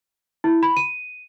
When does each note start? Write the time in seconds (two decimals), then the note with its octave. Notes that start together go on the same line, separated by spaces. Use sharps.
0.44 E4
0.63 B5
0.77 D#7